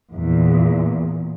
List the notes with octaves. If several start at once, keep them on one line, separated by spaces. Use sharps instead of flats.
E2 A#2